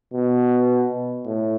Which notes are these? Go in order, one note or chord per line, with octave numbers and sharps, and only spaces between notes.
B2
A2